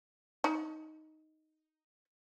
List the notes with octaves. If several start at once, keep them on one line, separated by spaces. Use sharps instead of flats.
D#4 B5